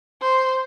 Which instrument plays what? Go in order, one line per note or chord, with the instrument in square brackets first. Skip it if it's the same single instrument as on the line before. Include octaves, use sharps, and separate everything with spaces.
[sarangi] C5